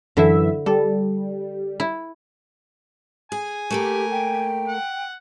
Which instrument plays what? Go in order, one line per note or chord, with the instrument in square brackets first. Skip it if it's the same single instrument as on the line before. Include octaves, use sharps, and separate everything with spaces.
[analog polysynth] F#2 E3 E5 [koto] D3 E4
[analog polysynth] G3 [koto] A4
[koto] E4
[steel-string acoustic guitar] G#4 [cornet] G#5
[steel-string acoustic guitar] A3 A#3 A#4 [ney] G4
[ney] G5
[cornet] F#5